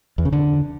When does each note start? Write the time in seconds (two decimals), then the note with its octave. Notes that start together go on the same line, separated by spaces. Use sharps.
0.18 E2
0.25 C#3
0.33 D3